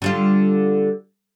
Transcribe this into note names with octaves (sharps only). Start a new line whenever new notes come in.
D3 G3 F4